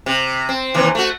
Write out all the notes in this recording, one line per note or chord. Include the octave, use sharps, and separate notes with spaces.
C3
C4
D#2 C3 E3
A3 F#4